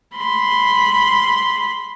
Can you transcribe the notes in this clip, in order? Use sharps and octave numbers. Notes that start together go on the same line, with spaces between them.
B5 C6